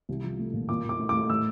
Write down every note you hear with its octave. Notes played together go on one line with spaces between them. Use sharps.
C2
F3
A3
A#2
A#2 D6
A#2 D6
A3
D6
A3
A2 E6